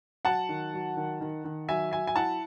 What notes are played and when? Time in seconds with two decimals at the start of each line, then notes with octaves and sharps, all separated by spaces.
0.25 F#3 F#5 A5
0.49 D#3
0.73 F#3
0.97 D#3
1.21 D#3
1.45 D#3
1.69 F#3 E5 G#5
1.91 F#3 E5 G#5
2.07 G#5
2.16 E4 F#5 A5